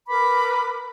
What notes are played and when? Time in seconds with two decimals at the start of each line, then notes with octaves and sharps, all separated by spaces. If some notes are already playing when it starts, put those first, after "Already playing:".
0.09 A#4 B4 B5 D6